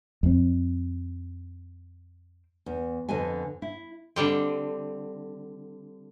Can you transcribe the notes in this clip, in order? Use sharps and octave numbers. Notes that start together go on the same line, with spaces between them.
F2 C4
E2
F2 D3 B4 D#5 G#5
E4
D3 G3 C4